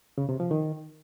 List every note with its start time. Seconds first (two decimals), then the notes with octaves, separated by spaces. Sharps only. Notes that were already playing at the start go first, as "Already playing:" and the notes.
0.18 C#3
0.29 C3
0.40 F3
0.51 D#3